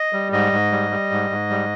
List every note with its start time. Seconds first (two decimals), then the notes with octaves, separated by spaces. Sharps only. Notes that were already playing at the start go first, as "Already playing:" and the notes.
Already playing: D#5
0.13 G3
0.33 G#2 D#5
0.52 G#2
0.72 G3
0.91 G3
1.11 G#2
1.31 G#2
1.51 G3